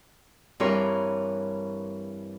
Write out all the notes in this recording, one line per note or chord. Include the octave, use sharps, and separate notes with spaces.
G2 E3 C4 A#4 C#5 C6